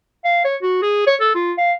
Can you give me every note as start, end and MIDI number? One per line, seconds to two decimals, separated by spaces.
0.25 0.42 77
0.45 0.56 73
0.62 0.82 66
0.82 1.03 68
1.06 1.15 73
1.20 1.31 69
1.35 1.53 65
1.58 1.72 77